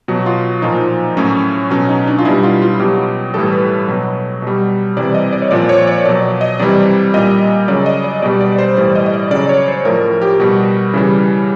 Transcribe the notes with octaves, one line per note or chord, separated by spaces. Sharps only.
B2 F#3 F#4
F4
A#2 F3 D#4
A2 F#3 C#4
B2 F#3 C#4
D#4
D4
F4
B2 G3 E4
F4
F4
B2 F#3 G4
A2 E3 G3 A4
B4
B2 F#3
B2 G3
C3 E3 G3 D5
D#5
D5
C#5
A#2 F3 D5
C#5
D5
B2 F#3 D5
D#5
C3 E3 G3 D5
A#2 G3 D#5
C#3 F#3 D5
D#5
D5
B2 G3 D5
D5
C5
A2 E3 G3 D5
D#5
D#5
D5
C#3 F#3 D5
C#5
C5
A2 F3 A#4
G4
B2 G3 F#4
C#3 E3 G3 E4